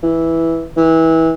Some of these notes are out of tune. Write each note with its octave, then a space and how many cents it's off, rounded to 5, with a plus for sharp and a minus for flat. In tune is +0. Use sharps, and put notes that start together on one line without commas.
E3 -5
E3 -25